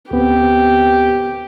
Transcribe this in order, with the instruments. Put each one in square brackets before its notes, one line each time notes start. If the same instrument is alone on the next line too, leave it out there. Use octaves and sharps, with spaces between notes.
[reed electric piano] D2 B3 C4 [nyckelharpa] G4